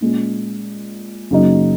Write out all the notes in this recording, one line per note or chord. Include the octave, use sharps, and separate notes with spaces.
A#2 G#3 C#4
F#2 C#3 F#3 A#3 D#4